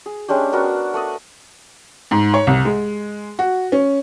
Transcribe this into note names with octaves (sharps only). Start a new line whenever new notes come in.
G#4
G#3 C#4 D4 G4
B3 D4 F#4 A#4
A3 D5 D#5
G#2
C#5
C2
G#3
F#4
C#4